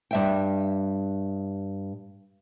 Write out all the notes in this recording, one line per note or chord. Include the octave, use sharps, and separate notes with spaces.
G2 E5 G5